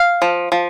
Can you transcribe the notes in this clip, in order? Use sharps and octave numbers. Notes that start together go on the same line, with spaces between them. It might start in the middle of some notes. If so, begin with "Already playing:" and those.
Already playing: F5
F3
F3